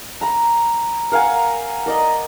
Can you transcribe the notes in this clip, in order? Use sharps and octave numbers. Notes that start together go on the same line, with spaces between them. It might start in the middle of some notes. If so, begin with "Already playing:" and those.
A#5 B5
A#4 F5 F#5 G#5
A#4 D5 D#5